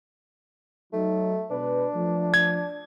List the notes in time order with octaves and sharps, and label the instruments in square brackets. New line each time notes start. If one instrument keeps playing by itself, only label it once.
[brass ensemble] F#3 D#4 [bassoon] A3
[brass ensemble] B2 G#3 B4 [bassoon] D4
[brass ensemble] F3 A3
[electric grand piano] G#6